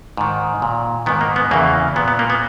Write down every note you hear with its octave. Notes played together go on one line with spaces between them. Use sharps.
G#2 D#3
A#2
G#2 D#3 B3
A#3
B3
E2 C#3 E3 A#3
A#2 B3
B3
A#3
B3